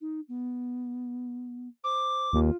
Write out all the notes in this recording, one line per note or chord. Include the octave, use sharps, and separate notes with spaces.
D#4
B3
C5 D6
D#2 F4